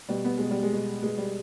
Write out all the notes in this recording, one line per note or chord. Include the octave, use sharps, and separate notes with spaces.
B2 G3
B3
B2 G#3
G3
G#3
B2
B2 G#3
G3